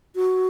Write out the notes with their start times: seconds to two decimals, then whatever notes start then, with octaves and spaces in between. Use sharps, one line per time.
0.16 F#4